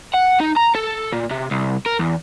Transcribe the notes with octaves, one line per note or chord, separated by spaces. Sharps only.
F#5
D#4
A#5
A4
A#2
C3
C2
A#4
E2